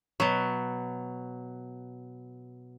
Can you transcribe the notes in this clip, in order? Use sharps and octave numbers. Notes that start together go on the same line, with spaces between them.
B2 F#3